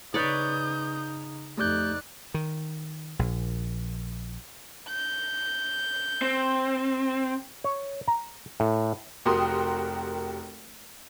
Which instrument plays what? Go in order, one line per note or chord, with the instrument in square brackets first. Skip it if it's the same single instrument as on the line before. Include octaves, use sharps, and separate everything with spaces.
[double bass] C#3 D#4 [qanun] B4 C#5 D5 [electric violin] D#6 G6
[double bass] F2 D#4 [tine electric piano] A3 G4 G6 [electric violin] D5 F#6
[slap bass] D#3
A#1
[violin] G6
[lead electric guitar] C4
[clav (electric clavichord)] C#5
A#5
A2
[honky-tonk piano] F1 F#4 G4 A#4 C6 D#6